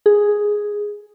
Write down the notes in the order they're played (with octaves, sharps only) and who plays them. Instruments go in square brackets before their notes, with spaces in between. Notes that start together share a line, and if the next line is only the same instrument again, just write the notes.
[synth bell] G#4